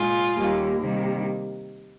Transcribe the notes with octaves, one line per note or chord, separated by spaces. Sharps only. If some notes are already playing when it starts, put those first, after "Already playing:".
Already playing: A#2 G#3 F4 G#4
D#2 D#3 G3 A#3
C3 D#3 G3 A#3